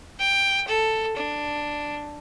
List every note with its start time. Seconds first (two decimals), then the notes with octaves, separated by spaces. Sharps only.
0.19 G5
0.68 A4
1.17 D4